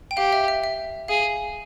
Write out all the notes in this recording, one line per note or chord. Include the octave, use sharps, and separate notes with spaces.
G5
G4 F5
E5
E5
E5
G#4 F5